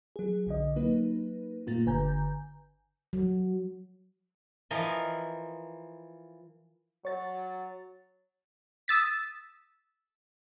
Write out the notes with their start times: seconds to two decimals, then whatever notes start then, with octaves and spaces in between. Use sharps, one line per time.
0.16 F#3 G#4
0.47 B1 D3 D#5
0.76 F#3 A#3 D#4 B4
1.67 G2 A#2 A3 A#3 F4 A6
1.86 G1 D3 B4 G#5 A#5 G6
3.13 F#3
4.71 E3 F3 A#4 D#5
7.05 F#3 C#5 A6
8.88 D#6 E6 A6 B6